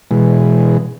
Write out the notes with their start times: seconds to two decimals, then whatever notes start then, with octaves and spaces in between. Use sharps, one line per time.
0.11 B2 E3 G#3